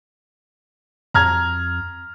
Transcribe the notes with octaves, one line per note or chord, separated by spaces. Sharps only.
F2 A#5 F6 G#6